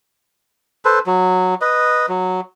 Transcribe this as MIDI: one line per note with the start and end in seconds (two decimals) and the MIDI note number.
0.85 0.99 69
0.85 0.99 71
0.85 0.99 72
1.06 1.55 54
1.61 2.06 71
1.61 2.06 75
2.09 2.41 54